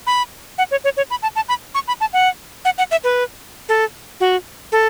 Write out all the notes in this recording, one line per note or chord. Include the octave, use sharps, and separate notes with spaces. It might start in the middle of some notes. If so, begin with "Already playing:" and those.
B5
F#5
C#5
C#5
C#5
B5
A5
A5
B5
C#6
B5
A5
F#5
F#5
F#5
E5
B4
A4
F#4
A4